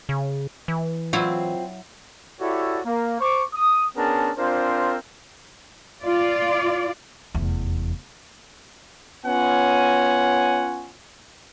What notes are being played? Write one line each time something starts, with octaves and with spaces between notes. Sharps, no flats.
C#3
E3
F#3 C4 E4 F4
E4 F#4 G4 A4 C#5 D5
A#3
C5 C#6 D6
D#6
B3 C#4 D4 G#4 A#4 A5
C4 D4 F4 A#4 C5
F4 D5
F1 E2
B3 C#4 F4 C#5 F#5 G#5